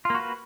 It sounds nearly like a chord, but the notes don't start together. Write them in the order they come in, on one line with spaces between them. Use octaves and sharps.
F4 A#3 F#4 B4